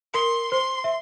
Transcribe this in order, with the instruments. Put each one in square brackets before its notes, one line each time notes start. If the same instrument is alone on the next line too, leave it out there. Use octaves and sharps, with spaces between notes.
[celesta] A#4 [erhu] C6
[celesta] C5 [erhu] C6
[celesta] E5